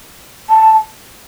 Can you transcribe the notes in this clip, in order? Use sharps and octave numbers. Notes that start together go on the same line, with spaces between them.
A5